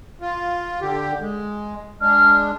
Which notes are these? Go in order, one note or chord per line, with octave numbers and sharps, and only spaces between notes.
F4
D3 G4
G#3
G#3 D4 F6